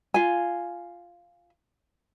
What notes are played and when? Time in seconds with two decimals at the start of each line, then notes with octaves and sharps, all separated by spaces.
0.14 F4 G#5